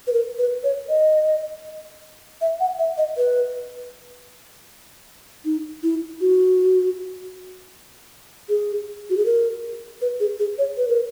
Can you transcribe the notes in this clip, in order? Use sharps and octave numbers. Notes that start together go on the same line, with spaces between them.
B4
A#4
B4
C#5
D#5
E5
F#5
E5
D#5
B4
D#4
E4
F#4
G#4
F#4
G#4
A#4
B4
G#4
G#4
C#5
B4
A#4